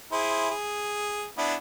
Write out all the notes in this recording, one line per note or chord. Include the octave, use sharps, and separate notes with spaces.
E4 G#4 C5
G#4
B3 D4 E4